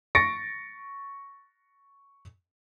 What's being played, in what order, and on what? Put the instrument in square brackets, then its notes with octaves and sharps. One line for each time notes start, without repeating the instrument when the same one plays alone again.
[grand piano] C#6 A6 A#6 C#7 D7